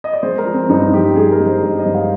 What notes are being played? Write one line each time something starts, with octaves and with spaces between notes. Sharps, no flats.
D#5
D5
G#3 C5
A#4
F3
C4
G2 D#4
G2 G4
G#3 G#4
A#4
G#3
C5
G2 D#5
D#5
G2
F5